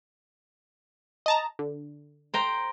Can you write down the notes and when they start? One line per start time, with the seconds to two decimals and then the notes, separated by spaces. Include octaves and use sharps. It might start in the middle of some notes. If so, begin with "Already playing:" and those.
1.26 D#5 A5 A#5
1.59 D3
2.34 C5 G5 A#5